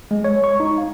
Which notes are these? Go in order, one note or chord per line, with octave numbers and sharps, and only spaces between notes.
G#3
C#5
C#6
D#4
F5